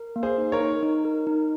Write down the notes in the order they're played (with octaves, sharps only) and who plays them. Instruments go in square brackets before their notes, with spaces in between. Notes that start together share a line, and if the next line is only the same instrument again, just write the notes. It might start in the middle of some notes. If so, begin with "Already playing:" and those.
Already playing: [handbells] A#4
A#3
[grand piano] G#4 C5
[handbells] D#4
[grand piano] A#4 C#5
[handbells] D#4
D#4
A#4
D#4